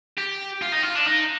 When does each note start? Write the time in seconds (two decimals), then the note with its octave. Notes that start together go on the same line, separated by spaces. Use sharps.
0.18 G4
0.62 F4
0.72 D#4
0.83 F4
0.95 D4
1.07 D#4